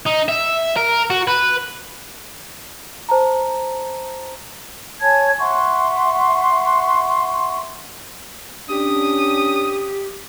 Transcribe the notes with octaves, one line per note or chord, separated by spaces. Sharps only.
D#4
E5
A#4
F#4
B4
C5 A5 A#5
C#5 G#5 A5 G#6
E5 F#5 C6 C#6
C#4 D4 G4 D#6